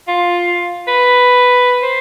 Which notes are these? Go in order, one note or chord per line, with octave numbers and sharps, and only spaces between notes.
F4
B4
C5